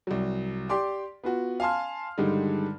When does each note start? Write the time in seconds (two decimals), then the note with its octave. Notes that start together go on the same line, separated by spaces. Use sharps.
0.07 C2 F#3
0.69 G4 D5 C6 D6
1.24 B3 F4 F#4
1.60 F5 G#5 A5 C6 F6
2.18 G2 D3 D#3 G3 G#3